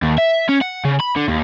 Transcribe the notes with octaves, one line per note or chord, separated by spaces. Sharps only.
D#2
E5
C#4
F#5
C#3
B5
D3
D#2